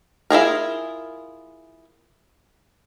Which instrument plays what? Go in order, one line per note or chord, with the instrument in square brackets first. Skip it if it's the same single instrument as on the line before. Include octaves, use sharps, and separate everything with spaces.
[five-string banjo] E4 F4 G#4 A#4